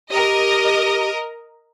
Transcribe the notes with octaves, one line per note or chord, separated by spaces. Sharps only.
G4 A#4 D#5